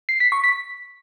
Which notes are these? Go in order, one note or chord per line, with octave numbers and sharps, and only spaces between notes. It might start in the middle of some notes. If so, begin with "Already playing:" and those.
C7
B6
C#6
B6